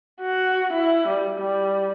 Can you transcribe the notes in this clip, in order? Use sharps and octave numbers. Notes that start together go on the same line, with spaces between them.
F#4
E4
G3
G3